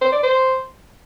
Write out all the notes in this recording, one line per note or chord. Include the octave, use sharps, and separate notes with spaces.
C5
D5
C5